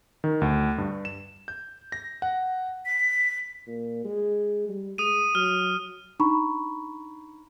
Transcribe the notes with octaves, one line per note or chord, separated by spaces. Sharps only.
D#3
D2
G2
E7
G6
A#6
F#5
B6
A#2
G#3
G3
G#3 D#6 D#7
F#3 F6
D4 D#4 A#5 B5 C#6